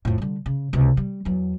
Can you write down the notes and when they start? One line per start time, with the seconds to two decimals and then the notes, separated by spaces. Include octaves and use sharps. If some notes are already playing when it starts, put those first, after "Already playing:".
0.05 F2 A2
0.18 D3 G3
0.46 C#3
0.73 C#2 C3
0.97 G3
1.25 E2 F#3